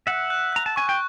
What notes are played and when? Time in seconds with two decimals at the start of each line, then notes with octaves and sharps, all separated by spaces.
0.07 E5 F#5 F#6
0.30 F#6
0.53 A#5 F#6
0.66 A5
0.76 G#5 C#6
0.89 G5